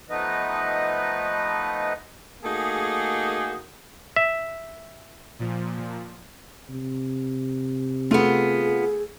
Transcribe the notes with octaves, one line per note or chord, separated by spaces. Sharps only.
F3 A3 B3 D#4 B4 D#5
A3 A#3 D#4 F#4 G#4
E5
A#2 F3
C3
A3 B3 F4 G#4